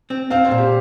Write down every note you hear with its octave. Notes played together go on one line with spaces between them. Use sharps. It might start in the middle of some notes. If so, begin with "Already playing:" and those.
C4
C4 F5
C5
A#2
G4